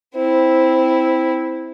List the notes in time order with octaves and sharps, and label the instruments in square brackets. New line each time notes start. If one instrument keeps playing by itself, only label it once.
[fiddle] C4 E4